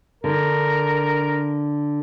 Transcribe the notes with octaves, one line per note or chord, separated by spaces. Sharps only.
D3 A#4